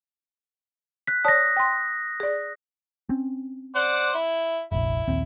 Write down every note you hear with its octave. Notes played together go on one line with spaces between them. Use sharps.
F#6 B6
C#5 D5 A5 D#6 A#6
G5 C6
G#4 D5
C4 C#4
C5 D5 F#5
E4
F1 A#1 E4
A#1 D#2 C4